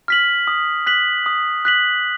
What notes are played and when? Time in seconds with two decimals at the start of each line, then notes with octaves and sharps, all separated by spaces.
0.08 F6 B6 F#7
0.47 D#6
0.86 F#6 B6 F#7
1.26 D#6
1.65 F#6 B6 F#7